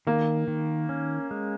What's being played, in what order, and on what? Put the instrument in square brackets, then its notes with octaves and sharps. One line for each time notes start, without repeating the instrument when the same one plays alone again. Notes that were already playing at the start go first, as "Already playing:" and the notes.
[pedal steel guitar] D#3 [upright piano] A#3
[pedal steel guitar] D#3
C#4
G#3